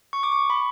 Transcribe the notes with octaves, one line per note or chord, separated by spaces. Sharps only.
C#6
D6
C#6
B5